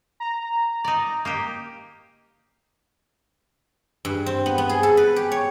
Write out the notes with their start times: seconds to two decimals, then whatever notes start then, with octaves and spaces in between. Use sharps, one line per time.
0.20 A#5
0.84 D#4 D5
1.25 A#3 D#4 G4
4.05 G2
4.26 C4
4.46 B3
4.58 B3
4.69 G#4
4.83 A4
4.97 B4
5.16 G4
5.32 C#5